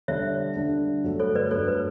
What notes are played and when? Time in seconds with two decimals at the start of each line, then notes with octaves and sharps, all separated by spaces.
0.08 D3 G3 D4 C#5 E5
0.57 D3 G3 D4
1.04 G2 F#3 A3
1.20 A4 C#5
1.35 B4 D5
1.51 G2 F#3 A3 A4 C#5
1.68 B4